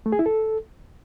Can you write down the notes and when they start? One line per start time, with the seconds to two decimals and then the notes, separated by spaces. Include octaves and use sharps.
0.06 A3
0.12 G#4
0.19 E4
0.26 A4